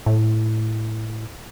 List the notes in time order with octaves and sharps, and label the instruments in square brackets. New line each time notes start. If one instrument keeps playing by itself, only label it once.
[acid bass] A2